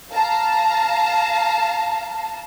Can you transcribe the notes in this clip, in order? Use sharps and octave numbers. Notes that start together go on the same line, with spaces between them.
F5 A5 A#5